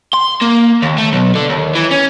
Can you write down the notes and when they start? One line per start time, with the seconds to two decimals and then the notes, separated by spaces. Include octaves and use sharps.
0.13 C6
0.41 A#3
0.82 D#2
0.98 A3
1.13 B1
1.35 D3
1.49 D#2
1.75 E3
1.91 C#4